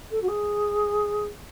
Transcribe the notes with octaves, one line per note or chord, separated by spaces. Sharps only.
A4
F#4
G#4